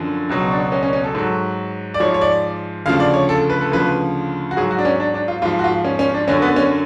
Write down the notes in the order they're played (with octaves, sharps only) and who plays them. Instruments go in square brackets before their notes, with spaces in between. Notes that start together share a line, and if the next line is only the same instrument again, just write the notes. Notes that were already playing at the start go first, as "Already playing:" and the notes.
Already playing: [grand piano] F#2 D3 F3
C#2 B2 F#3
D4
C#4
C#4
C#4
A4
G#2 F#3
D5
G#2 F3 C#5
C#5
D5
D2 C#3 F3 F5
D5
C#5
A4
B4
A4
D2 C#3 F3 B4
F#4
G#2 F#3 G#4
F#4
D4
C#4
D4
D4
F4
G#2 F3 F4
F#4
F4
C#4
C#4
D4
F#2 D3 F#3 C#4
B3
C#4